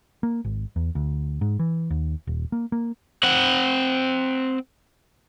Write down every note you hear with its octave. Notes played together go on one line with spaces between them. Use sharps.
A#3
G#1
E2
D2
G#2
E3
D#2
D#1
A#3
A#3
C4 F#5